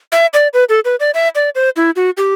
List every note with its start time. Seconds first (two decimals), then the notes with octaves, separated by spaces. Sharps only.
0.12 E5
0.34 D5
0.54 B4
0.69 A4
0.85 B4
1.00 D5
1.14 E5
1.35 D5
1.55 C5
1.76 E4
1.96 F#4
2.17 G4